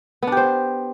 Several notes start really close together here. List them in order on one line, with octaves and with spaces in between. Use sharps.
B3 D4 G4 C5